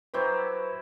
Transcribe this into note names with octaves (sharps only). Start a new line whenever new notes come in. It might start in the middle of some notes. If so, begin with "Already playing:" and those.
F#3 E4 G4 B4 C5